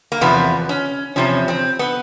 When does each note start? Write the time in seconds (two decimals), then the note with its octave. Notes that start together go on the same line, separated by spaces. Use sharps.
0.12 A#3
0.21 E2 C3 F3 B3
0.69 C#4
1.16 E2 C3 F3 C#4
1.48 C4
1.79 B3